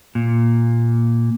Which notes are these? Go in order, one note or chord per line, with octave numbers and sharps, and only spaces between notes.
A#2